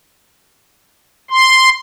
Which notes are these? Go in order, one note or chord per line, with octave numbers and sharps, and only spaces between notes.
C6